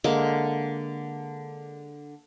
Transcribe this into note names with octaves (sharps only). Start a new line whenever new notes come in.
D3 G#3 A#3